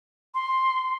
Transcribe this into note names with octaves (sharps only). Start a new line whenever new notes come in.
C6